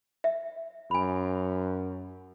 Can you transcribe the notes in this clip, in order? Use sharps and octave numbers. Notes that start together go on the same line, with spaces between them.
E5
F#2 G#5 B5